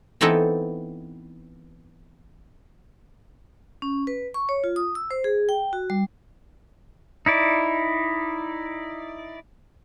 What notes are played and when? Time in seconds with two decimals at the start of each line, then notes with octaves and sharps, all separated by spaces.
0.21 E3 B3 C4 D#4 E4 A4
3.82 C#4
4.07 B4
4.34 C#6
4.49 C#5
4.64 F4
4.76 D#6
4.95 E6
5.11 C5
5.24 G#4
5.49 G5
5.73 F#4
5.90 G3
7.26 D#4 E4 D5